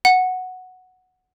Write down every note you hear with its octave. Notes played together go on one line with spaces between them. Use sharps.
F#5